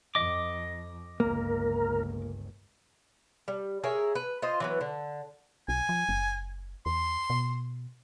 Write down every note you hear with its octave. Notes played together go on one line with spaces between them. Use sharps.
F2 D#5 D6
G1 C#2 A#3 A#4
G3
G#4 A#4 C#5 E5
B4
F4 C5 D#5
E3 F#3 B3
D3
B1 G#5
F3
F#1
E2 C6
B2